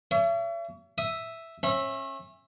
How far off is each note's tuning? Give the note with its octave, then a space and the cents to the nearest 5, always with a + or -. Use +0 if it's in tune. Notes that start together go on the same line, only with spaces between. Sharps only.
C#5 +40 E5 +40
E5 +0 D#6 +0
C#4 -35 E5 +0